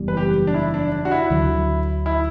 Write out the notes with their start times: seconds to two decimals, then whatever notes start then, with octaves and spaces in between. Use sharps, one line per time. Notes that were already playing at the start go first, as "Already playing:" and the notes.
Already playing: F#1 E2 G3
0.08 B4
0.17 G4
0.47 D4
0.54 E4
0.74 D4
0.92 D4
1.05 F#4
1.11 E4
1.30 D2 D3 F#3
2.06 E4